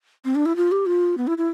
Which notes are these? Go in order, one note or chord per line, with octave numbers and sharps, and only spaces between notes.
C4
D4
E4
F4
G4
F4
B3
E4
E4